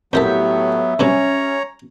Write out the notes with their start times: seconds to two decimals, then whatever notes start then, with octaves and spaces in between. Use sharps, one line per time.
0.13 F2 A2 F#3 B3 G4 A#4 E5 A5
0.99 G2 C3 F#3 C#4 C#5 A#5